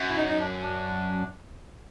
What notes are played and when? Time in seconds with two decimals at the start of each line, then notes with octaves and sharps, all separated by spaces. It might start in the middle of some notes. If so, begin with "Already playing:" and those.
Already playing: F#2
0.09 E4
0.16 D#4
0.29 D#4
0.40 D4
0.62 D4